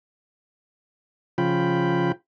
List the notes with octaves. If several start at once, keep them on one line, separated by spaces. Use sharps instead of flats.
C#3 F3 F4 G5 B5